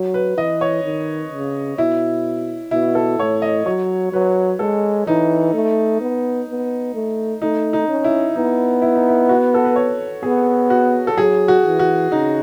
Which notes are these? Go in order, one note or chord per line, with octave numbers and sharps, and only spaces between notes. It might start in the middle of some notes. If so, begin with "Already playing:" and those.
Already playing: F#3
B4
E3 D#5
C#5
D#3
C#3
B2 E4
B2 E4
A4
A2 C#5
D#5
F#3 C#5
F#3 B4
G#3 A4
E3 D#4
A3
B3
B3
A3
A3 D#4
D#4
C#4
E4
B3 D#4
E4
D#4
E4
F#4
A4
B4
C#5
B3 G#4
F#4
A4
F#3 G#4
F#4
E3
F#4
C#3 D#4